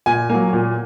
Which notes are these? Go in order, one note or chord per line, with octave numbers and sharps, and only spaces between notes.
A#2 G#5
F#3 A#3
A#2